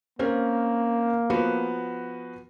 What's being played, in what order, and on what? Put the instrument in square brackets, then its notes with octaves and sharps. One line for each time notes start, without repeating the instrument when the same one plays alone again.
[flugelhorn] A#3 [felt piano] C4 C#4 A#4
[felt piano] F3 B3 F#4